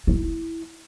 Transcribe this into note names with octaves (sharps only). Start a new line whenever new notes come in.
E4